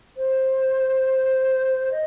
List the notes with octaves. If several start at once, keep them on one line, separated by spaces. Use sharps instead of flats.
C5
D#5